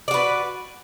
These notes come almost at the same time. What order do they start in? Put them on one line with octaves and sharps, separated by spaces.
D5 F#4 B4